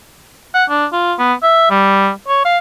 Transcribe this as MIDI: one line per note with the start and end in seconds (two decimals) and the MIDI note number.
0.54 0.65 78
0.69 0.86 62
0.92 1.14 65
1.19 1.33 59
1.43 1.70 76
1.70 2.10 55
2.28 2.41 73
2.45 2.58 77